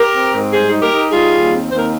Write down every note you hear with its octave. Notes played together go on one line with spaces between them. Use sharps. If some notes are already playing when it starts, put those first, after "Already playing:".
Already playing: G4 A#4
C4
G#2
G3 G#4 C5
D#4
G4 A#4
D#4
G3 F4 G#4
D#2
C4
D#2 C5
A#4